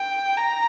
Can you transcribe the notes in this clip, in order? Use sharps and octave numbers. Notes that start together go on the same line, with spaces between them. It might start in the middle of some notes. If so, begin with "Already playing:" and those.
Already playing: G5
A#5